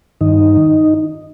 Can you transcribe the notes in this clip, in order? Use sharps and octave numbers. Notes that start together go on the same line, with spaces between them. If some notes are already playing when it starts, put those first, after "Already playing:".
G2 D#3 D#4